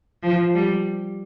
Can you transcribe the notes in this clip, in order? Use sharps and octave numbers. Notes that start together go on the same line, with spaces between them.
F3
G3